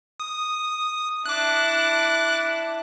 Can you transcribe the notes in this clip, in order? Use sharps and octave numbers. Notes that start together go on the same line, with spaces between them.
D#6
D4 E4 D6 F#6